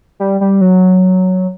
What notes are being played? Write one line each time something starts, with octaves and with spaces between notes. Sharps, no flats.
G3
G3
F#3